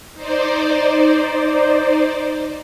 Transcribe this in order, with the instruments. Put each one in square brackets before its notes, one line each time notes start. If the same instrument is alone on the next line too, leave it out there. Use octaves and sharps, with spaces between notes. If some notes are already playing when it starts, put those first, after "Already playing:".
[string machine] D#4 C5 D5